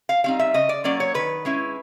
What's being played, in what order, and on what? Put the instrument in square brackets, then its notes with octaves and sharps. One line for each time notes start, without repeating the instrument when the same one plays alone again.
[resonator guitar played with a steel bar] F5
G3 C4 D#4 F5
E5
C#3 D#5
D5
F#3 A#3 C#4 D5
C#5
D#3 B4
G#3 C#4 E4